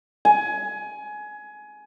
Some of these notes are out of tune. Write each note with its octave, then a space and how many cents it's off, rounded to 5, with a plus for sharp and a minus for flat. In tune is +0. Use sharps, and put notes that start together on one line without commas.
G#5 +20